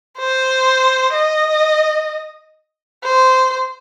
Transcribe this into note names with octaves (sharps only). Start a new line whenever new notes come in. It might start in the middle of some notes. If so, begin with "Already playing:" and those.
C5
D#5
C5